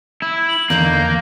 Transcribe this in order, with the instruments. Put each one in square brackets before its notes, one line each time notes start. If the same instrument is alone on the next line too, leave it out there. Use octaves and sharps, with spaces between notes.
[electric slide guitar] E4
[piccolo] F#7
[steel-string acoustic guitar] E2 D3 D#3 [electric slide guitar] A#3 [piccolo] G6